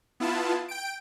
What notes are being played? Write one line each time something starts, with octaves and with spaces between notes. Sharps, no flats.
B3 E4 F4 A5
G5 D7